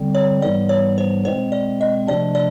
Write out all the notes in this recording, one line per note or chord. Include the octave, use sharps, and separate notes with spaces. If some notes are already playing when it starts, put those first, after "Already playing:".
Already playing: D3 G3 C4
C#5
G#2 E3 G3 B3 D5
C#5
C5
B2 G#3 C4 C5
D5
D#5
C3 F3 A3 D4 D5
D5